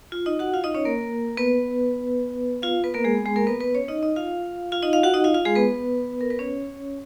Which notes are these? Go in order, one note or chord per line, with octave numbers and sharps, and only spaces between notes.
F4
D#4 D#5
F#4 F#5
F4 F5
D#4 D#5
C#4 C#5
A#3 A#4
B3 B4
F4 F5
B3 B4
A#3 A#4
G#3 G#4
B3
G#3 G#4
A#3 A#4
B3 B4
B3 B4
C#4 C#5
D#4 D#5
D#4 D#5
F4 F5
F4 F5
D#4 D#5
F4 F5
F#4 F#5
D#4 D#5
F4 F5
F4 F5
G#3 G#4
B3 B4
A#4
B4
C#4 C#5